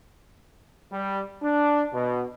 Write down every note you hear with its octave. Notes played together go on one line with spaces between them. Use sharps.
G3
D4
B2